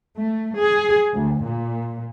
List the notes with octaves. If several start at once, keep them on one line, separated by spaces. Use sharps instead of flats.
A3
G#4
D2
A#2